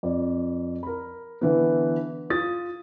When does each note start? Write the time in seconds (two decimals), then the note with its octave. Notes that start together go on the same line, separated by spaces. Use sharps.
0.03 F2 D5
0.83 A#4 B5
1.41 D3 E3 B3
2.30 F4 D#6 A6